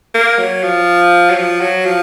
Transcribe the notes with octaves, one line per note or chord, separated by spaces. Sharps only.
A#3
F#3
F3
F#3
F3
F#3
F3